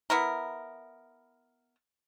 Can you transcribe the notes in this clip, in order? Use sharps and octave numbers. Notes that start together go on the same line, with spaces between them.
B3 E4 A#4